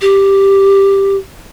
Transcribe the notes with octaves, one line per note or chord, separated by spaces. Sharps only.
G4